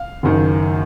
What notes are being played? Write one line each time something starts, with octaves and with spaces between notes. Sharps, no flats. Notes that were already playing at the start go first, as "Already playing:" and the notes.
Already playing: F5
F#1 F#2 D#3